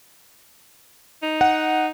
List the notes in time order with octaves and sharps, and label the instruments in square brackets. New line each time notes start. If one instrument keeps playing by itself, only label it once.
[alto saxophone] D#4
[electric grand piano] F#5